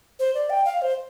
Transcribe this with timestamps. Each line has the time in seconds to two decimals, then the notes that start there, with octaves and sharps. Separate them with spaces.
0.19 C5
0.35 D5
0.50 G5
0.65 F5
0.82 C5